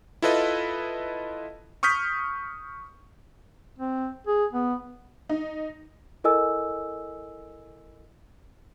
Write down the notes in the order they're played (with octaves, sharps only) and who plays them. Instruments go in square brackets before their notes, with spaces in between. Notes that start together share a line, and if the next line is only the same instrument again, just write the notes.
[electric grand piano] E4 F4 A4 B4 D#5
C#6 D#6 F6 G6 B6
[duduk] C4
G#4
B3
[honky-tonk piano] D#4
[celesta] E4 A4 A#4 D#5 G#5 E6